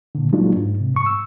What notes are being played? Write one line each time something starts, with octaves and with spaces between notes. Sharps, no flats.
A#2 D3
F#3 G#3 A#3 D4 D#4 F4
G#2
C3
G#2 C#6
E6